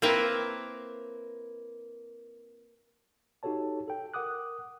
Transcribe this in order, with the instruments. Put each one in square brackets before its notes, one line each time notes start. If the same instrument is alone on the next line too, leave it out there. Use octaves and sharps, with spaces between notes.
[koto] A#3 C4 E4 A#4 B4
[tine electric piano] D#4 F#4 G4 A4 C#5 A5
A4 G5
A#4 F#5 D6 D#6 F#6